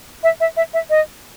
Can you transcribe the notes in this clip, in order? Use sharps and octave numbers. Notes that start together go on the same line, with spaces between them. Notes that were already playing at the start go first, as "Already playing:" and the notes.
E5
E5
E5
E5
D#5